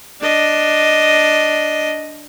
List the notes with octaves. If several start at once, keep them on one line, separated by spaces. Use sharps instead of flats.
D4 D#5